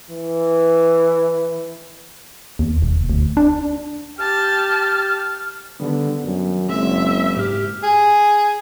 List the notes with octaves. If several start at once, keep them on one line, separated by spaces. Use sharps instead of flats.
E3
D#2
E1
D2
D4
G4 A5 F6
D3 D#3 G3 B3
F#2
F#1 G#3 C4 E5
G#2 G4 F6
G#4